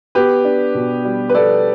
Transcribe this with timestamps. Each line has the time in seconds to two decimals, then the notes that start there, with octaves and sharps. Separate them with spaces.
0.15 B3 G4 B4
0.45 D4
0.75 B2
1.05 G3
1.29 B4
1.35 B3 A4 D5